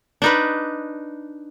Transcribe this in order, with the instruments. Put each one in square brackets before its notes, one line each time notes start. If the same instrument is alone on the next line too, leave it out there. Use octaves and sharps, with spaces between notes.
[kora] D4 D#4 B4